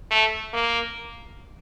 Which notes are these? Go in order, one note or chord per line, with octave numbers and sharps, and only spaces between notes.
A3
A#3